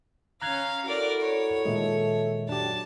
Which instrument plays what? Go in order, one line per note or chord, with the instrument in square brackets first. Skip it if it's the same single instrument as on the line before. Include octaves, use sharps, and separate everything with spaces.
[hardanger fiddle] C#4 F5 [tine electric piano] A#5 F#6 G#6
[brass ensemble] E4 F#4 A4 [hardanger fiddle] A#4 D5
[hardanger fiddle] C#5
[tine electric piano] A#2 D#3 G#3 [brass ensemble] A4 E5
[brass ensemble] F#3 [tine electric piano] D4 G4 [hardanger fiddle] A5